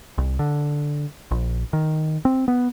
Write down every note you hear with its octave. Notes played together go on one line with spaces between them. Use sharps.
C2
D3
A#1
D#3
C4
B3